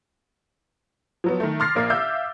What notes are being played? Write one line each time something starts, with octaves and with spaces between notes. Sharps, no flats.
F3 F#3 B3
D#3 A3
C6 D6 F6 A6 A#6 C7
A#1 A#3 D6 C7
E5 F5 E6 G6